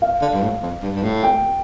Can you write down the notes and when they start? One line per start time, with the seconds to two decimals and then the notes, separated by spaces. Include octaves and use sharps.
0.02 F5
0.22 D3
0.33 G2
0.42 A2
0.63 F2
0.83 G2
0.95 G2
1.03 A2
1.23 G5